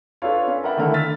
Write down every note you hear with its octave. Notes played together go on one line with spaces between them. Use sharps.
D4 F4 A4 B4 C#5 F5
C#4 B4
A#4 D5 E5 F#5 G5 B5
D3 D#3 A3 E4 A#4
E6 F6 A6 B6